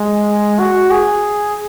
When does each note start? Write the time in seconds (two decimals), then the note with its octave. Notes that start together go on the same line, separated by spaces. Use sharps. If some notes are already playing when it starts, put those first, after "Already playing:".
Already playing: G#3
0.59 F#4
0.91 G#4